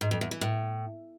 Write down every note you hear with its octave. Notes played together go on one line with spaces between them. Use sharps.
G#2
F2
E2
E3
A2